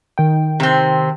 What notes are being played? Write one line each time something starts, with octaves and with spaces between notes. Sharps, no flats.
D#3 G5
C3 C4